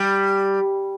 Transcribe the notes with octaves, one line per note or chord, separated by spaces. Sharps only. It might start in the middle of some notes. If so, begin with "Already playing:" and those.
Already playing: G3